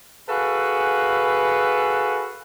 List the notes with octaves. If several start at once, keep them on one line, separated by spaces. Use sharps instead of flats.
F#4 G#4 A4 B4 F5